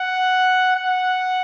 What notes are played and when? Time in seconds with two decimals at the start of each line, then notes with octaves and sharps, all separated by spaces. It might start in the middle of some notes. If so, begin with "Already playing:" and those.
Already playing: F#5
0.76 F#5